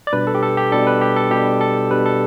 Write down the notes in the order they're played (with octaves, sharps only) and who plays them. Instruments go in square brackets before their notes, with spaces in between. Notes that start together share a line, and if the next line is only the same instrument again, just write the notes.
[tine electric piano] D5
B2 G3 D4 B4
A4
G4
A4
G4
B2 G3 D4 A4
B4
G4
A4
B2 G3 D4 G4
A4
B2 G3 D4 B4
A4